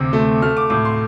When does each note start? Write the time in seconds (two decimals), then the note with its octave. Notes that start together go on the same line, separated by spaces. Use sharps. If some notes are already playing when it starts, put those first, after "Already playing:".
Already playing: D2 C3 C4 D6
0.13 A3
0.42 A3 F6
0.57 D6
0.70 A2 D6
0.85 C6